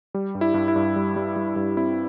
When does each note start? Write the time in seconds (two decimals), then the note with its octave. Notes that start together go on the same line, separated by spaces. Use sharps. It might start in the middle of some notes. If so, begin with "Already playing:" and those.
0.14 G3
0.35 G2
0.41 E4
0.54 G2
0.68 E4
0.76 G2
0.96 G3
1.16 G3
1.36 G3
1.56 G2
1.77 C4 E4